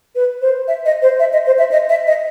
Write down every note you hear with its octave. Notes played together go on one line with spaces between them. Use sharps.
B4
C5
E5
D#5
C5
E5
D#5
C5
E5
D#5
E5
D#5